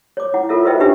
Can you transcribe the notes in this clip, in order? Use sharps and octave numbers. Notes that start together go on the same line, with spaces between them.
C#5 D6
E4 F#5
F4 A4 A#4 C#5 E5
F#4 B4 C5 D#5 E5 G5
D4 D#4 G4 B4 C#5 E5